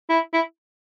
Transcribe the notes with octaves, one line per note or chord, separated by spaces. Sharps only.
E4
E4